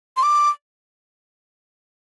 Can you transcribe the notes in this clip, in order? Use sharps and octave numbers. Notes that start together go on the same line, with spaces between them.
C6
D6